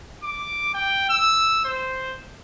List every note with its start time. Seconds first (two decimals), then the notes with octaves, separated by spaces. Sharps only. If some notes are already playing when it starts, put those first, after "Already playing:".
0.23 D6
0.74 G5
1.09 E6
1.65 C5